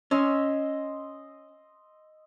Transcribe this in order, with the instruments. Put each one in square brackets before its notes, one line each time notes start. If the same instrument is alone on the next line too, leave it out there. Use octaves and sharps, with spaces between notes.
[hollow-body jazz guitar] C#4 [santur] D#5 C6 E6